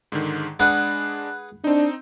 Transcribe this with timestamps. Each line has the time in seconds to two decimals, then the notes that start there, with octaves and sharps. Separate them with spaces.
0.12 G#2 D3 D#3
0.60 G#3 D4 G#4 B4 F#5
1.64 C4 D4 D#4